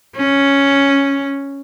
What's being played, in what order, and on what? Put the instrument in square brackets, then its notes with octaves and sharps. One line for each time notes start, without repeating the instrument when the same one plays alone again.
[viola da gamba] C#4